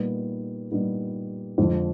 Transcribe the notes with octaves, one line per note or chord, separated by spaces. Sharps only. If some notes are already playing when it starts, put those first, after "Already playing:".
Already playing: A#2 G3 B3 D#4
A#2 G3 B3 D#4
F2 D3 F3 G#3